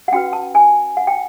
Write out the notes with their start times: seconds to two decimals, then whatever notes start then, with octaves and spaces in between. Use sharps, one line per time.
0.08 F#5
0.12 C#4 F#4 B4 G5
0.33 A5
0.55 G#5
0.97 F#5
1.07 G5